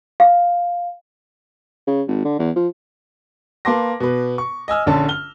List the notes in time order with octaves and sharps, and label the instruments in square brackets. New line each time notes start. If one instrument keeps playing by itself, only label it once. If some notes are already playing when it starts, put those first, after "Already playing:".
[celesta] F5
[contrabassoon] C#3
G#1
D3
E2
F3
[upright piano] A#3 B4 A5 C6 D6 A#6
B2 B4
C#6
D#5 G#5 E6 F6
A#1 D3 C#4 A5
F6 G7